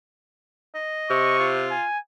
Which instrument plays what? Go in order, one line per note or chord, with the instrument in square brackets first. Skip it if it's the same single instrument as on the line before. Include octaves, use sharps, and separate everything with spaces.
[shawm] D#5
[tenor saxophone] C3 [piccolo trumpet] C#6
[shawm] F4
[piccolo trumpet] G#5